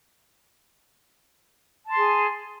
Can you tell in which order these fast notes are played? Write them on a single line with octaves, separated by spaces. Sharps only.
A5 C6 G#4